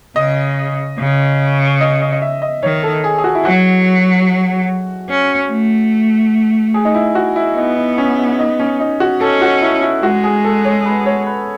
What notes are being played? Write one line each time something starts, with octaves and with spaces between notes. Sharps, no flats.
C#3 D#5
C#3
D#5
D#5
D#5
E5
D#5
D#3 C#5
A4
G#4
G#4
F#4
E4
F#3 F#4
C#4
A3
G#4
D#4
E4
F#4
E4
B3 D#4
D#4
C#4
D#4
D#4
C#4
D#4
F#4
C#4 A4
F#4
E4
E4
G#3 F#4
G#4
A4
C#5
B4
C#5
B4